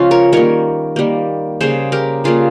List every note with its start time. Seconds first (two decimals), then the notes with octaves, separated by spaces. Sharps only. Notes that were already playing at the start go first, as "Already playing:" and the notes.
Already playing: C#3 F3 G#3 C#4 F4
0.11 A#4 C#5
0.32 D#3 G3 A#3 A#4 C#5
0.96 D#3 G3 A#3
1.61 C#3 G3 A#3 G#4 C5
1.92 G4 A#4
2.24 C#3 G3 A#3 F4 G#4